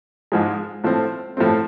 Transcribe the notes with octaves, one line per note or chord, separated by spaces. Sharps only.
G#2 F3 G#3
A2 F3 A3 C4
A2 F3 A3 C4